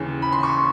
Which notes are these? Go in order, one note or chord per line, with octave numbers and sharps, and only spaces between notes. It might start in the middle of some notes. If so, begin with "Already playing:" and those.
Already playing: D#2 C#3 E3
B5
C6
C#6